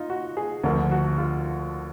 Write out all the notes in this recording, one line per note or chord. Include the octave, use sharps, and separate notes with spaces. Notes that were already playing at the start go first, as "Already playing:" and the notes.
Already playing: D#4 F4
F#4
G#4
D2 D3 F3 A#4
F#4
F4